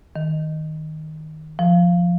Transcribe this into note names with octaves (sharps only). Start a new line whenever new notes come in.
D#3
F3